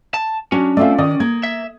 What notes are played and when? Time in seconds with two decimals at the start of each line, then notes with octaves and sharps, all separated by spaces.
0.14 A5
0.52 F#3 C#4 D4 F#4
0.77 A3 C4 F4 D5 E5
0.98 D#3 D5 D#6
1.20 A#3 G#6
1.43 E5